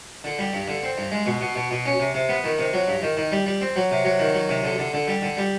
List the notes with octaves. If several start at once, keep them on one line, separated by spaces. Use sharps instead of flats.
D3
G3
G2
D3
C4
G2
G#3
B2
B2
B2
B2
C#4
C3
C3
B3
D#3
C3
F#3
G2
D#3
D#3
G3
G3
C4
F#3
C3
F#3
D#3
F#3
C3
D3
D3
D3
G3
D3
G3